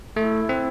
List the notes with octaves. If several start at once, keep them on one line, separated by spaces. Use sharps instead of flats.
A3 E4
C4